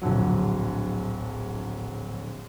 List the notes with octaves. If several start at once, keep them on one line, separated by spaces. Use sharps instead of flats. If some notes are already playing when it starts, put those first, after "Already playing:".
D1 A#1 D3 F#3